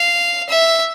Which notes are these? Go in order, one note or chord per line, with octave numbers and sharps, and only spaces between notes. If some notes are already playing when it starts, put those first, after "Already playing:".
Already playing: F5
E5